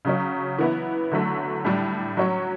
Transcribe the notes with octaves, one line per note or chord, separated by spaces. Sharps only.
C#3 F#3 C#4
E3 B3 E4
D3 F#3 A3
A2 G3 D4
F#3 C#4 F#4 C#5